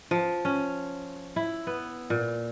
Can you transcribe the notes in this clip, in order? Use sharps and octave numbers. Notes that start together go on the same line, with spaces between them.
F3
C#4
E4
B3
A#2